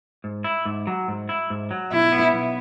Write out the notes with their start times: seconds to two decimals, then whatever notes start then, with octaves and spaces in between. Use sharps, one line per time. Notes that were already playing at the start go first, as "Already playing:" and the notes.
0.24 G#2
0.44 E4
0.66 G#2
0.87 F#3
1.08 G#2
1.29 E4
1.50 G#2
1.71 F#3
1.92 B1 E4
2.12 B3
2.34 B1